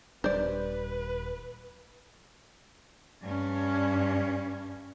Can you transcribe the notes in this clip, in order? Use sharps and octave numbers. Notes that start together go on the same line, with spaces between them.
D#1 G3 D4 B4 C5 D5
G2 C#4